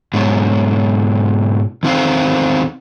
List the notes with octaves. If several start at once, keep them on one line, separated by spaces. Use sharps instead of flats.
G#2 B2 F#3
E2 D#3 C4 D#4 C5 F5